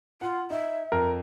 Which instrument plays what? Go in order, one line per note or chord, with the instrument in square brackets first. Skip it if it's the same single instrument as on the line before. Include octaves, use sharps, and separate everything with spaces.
[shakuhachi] F4 [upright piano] F#5
[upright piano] D#4 [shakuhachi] E5
[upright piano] F2 [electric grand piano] A#4